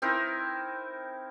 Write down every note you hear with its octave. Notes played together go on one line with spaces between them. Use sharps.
C4 D#4 E4 A#4